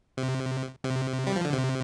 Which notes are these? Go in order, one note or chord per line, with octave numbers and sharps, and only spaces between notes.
C3
C3
G3
F3
D3
C3